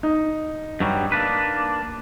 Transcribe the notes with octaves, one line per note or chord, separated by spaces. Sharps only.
D#4
G2 F#3 G3
A#3 D4 B4